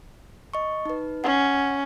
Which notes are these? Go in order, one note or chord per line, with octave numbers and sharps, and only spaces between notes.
D#5 C#6
D#4 B4
C#4 F#5